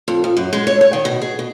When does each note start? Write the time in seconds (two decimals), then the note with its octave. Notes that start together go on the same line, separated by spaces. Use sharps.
0.08 F2
0.24 F2
0.37 F#2
0.53 G#3
0.67 C#5
0.81 C#5
0.93 D#3
1.05 B2
1.22 G#4
1.39 B2